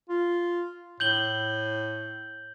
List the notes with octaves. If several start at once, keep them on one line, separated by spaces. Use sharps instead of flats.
F4
A2 G6 F#7 G7